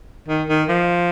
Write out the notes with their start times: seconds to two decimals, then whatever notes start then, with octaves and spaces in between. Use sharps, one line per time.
0.28 D#3
0.49 D#3
0.69 F3